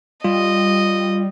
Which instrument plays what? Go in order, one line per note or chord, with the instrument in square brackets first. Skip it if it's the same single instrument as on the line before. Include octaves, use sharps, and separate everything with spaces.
[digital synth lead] G3 [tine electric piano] F4 [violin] D#5